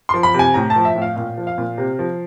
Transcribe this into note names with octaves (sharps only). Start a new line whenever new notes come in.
F3 C6
B5
C3 G#5
A2 A#5
A5
F3
E5
A2
F5
A#2 F5
F3
F5
A#2
C3
F3